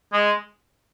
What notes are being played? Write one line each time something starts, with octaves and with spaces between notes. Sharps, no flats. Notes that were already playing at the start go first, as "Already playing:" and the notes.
G#3